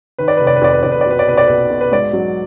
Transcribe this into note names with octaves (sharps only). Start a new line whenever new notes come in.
D#3 B4
D5
F1 B4
D5
B4
F2 D5
B4
F2 D5
B4
D5
B2 B4
D5
B1 B4
D5
B1 B4
B2
B4
G#2 D5
F#3